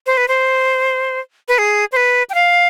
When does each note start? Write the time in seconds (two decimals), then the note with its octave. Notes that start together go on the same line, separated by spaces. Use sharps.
0.07 C5
0.17 B4
0.28 C5
1.48 B4
1.58 G#4
1.92 C5
1.96 B4
2.30 G5
2.34 F5